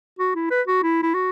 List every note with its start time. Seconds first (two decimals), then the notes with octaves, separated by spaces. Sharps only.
0.19 F#4
0.36 E4
0.51 B4
0.68 F#4
0.83 E4
1.03 E4
1.14 F#4